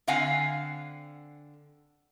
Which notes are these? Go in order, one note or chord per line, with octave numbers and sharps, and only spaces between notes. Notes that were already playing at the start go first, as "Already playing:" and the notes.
D3 C4 F5 F#5 G#5